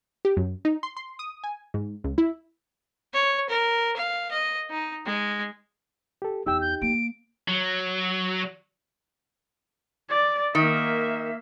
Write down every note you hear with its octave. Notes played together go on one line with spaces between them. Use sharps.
G4
F#2
D#4
C6
C6
D#6
G#5
G#2
C#2
E4
C#5
A#4
F5
D#5
D#4
G#3
G4 A4
E2 D#4 G4 G5 E6
G6
A#3 D7
F#3
D5
D#3 A#3 E5